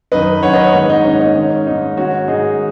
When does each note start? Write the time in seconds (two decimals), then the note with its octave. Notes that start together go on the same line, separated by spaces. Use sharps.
0.12 F#2 D#3 B4 D#5
0.43 F#2 D#3 C#5 F#5
0.53 B4 D#5
0.64 C#5 F#5
0.74 G#2 D#3
0.89 D#4
1.05 G#2 D#3 C#4
1.20 D#4
1.35 G#2 D#3 C#4
1.67 G#2 D#3 D#4
1.97 G#2 D#3 C#4 F#4
2.28 G#2 D#3 D#4 G#4